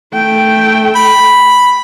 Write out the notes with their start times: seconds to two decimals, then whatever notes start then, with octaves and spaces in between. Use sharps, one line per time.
0.13 A3 G5
0.96 B5